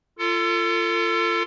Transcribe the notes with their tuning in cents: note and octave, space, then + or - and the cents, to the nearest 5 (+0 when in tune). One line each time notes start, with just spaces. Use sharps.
F4 -20 A4 +30